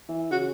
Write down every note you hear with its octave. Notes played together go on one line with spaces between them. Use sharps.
E3
C#3 F#4